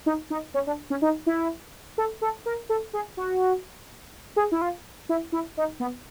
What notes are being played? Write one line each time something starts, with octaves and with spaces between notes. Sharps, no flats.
D#4
D#4
C#4
D4
C#4
D#4
E4
A4
A4
A#4
A4
G#4
F#4
G#4
E4
F4
E4
E4
D#4
B3